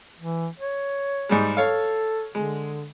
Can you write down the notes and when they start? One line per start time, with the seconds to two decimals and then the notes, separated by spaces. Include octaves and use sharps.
0.19 E3
0.60 C#5
1.29 G#2 G3 G#3
1.57 A4 C#5 F5
2.35 D3 G#3